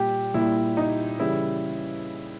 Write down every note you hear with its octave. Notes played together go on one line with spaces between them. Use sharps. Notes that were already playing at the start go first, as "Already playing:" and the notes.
Already playing: A#2 G3 G4
A#2 G3 E4
D#4
C#3 E3 G3 E4